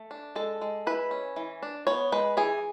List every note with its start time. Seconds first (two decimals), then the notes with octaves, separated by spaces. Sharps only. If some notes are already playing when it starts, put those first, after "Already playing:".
Already playing: A3
0.11 D4
0.36 G#3 A4
0.62 G#3
0.87 E4 B4
1.11 C#4
1.36 E3
1.63 D4
1.87 B3 C#5
2.12 G#3 B4
2.37 E3 G#4